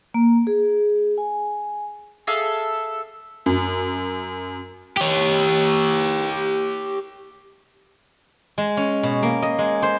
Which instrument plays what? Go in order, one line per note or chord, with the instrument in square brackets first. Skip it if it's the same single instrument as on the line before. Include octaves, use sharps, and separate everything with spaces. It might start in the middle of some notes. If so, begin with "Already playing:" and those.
[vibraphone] A#3
G#4
G#5
[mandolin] G#4 A4 E5 F5
[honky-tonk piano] F#2
[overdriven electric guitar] G4 C#5
[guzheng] G#3
C#4
B2
A#3
D#5
G#3
C5